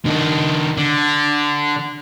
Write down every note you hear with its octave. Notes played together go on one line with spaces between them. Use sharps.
D#3 D4
D3